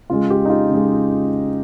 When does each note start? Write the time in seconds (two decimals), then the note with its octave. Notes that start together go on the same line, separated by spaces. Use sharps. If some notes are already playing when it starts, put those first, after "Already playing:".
0.10 C#3 G#3 F4
0.30 G4
0.45 D#4
0.50 F4
0.69 C#3 G#3